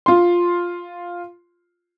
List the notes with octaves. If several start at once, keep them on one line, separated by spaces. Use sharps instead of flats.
F4 C6